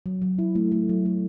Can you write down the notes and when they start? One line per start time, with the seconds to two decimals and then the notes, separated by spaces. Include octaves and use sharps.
0.06 F#3
0.22 F#3
0.39 E4
0.55 A3
0.72 A3
0.89 F#3
1.05 A3